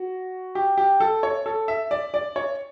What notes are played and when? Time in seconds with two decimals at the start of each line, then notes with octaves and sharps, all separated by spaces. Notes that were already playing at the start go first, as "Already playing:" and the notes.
Already playing: F#4
0.55 G4
0.78 G4
1.00 A4
1.23 C#5
1.46 A4
1.68 E5
1.91 D5
2.14 D5
2.36 C#5